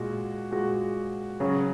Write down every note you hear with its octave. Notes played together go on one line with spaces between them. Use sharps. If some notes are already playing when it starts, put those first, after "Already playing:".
Already playing: A#2 G#3 F#4
A#2 G#3 F#4
C#3 F#3 C#4 F#4